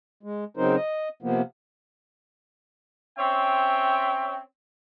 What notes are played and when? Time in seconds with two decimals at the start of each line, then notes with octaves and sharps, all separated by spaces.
0.23 G#3
0.57 C#3 F#3 C4 D#4 A#4 C5
0.76 D#5
1.23 C3 F3 A#3 B3
3.18 C4 C#4 C5 C#5 E5 G5